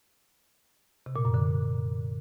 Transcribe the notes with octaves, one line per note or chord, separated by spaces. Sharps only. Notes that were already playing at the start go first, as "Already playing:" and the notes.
C3
A#2
F#2
D3